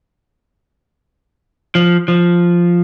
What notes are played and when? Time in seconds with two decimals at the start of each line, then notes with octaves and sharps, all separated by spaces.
1.75 F3
2.08 F3